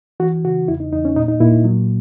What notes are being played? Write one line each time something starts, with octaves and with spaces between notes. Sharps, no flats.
E3 F#4
C#3 F#4
E2 E4
D#4
E2 D#4
C#4
A#2 D#4
D#4
A#2 E4
F#3